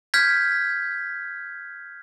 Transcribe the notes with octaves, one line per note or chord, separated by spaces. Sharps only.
F6 G6 G#6 B6